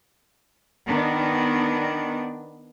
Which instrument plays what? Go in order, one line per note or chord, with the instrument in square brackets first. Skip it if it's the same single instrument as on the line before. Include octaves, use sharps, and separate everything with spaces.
[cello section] D#3 B3 D4